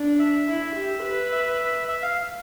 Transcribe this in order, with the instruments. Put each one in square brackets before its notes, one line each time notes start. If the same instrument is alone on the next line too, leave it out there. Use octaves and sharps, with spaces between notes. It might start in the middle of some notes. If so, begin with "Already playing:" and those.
Already playing: [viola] D4
[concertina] E5
[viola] E4
G4
B4
[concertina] E5
E5
F5